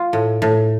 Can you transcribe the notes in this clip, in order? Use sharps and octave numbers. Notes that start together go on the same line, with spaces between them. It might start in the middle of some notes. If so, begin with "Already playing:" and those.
Already playing: F4
A2
A2